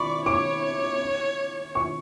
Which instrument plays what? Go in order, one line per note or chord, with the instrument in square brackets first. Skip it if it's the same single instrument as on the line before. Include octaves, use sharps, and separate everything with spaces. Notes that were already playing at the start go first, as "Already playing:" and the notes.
Already playing: [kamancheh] D5 [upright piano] B5 C#6
[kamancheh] C#5 [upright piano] D6
[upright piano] C#6